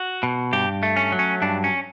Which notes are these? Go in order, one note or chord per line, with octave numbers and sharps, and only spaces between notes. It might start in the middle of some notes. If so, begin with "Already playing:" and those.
Already playing: F#4
B2
G2 G4
A3
C#4
F#3
C#4
G2 D4
C#4